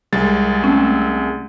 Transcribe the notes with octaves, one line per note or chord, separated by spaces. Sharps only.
C2 G#3 A6
A3 C4 C#4